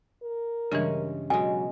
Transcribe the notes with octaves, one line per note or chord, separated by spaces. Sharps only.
A#4
G2 C#3 E3 G#3 C#4
B2 F#3 G#3 G#5